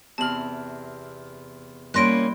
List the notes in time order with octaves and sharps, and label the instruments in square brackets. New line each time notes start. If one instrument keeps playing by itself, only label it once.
[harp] E2 C3 F6 [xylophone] A5 F#7
[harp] G3 E4 C6 [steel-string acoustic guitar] A#3 C#4 [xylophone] F#6 A#6 D7